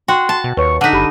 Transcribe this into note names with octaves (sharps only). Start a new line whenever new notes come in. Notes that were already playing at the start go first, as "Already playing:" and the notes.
F#4 G5 C6
A5
B2
D#2 B4 C#5 C#6
D3 D#4 F#5 F#6 B6 D#7
F#1 G4 B5